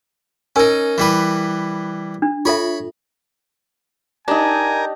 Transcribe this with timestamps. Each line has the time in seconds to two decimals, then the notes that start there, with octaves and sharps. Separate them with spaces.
0.56 C#4 D#4 A#4 G#5
0.98 E3 G3 B4
2.22 D4
2.45 F4 A4 C#5 E5 B5
4.28 D4 D#4 G4 A#4 G#5